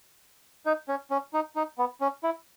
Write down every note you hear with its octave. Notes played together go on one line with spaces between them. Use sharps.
D#4
C#4
C#4
D#4
D#4
B3
C#4
E4